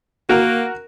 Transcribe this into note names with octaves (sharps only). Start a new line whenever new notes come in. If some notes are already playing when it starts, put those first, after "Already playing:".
A#3 F#4 A#4